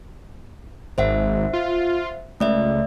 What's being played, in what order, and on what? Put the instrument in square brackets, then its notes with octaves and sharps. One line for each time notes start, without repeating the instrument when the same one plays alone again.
[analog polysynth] G#1 [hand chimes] C5 E5 F#5
[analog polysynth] F4
[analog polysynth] C#2 [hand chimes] A3 D5 E5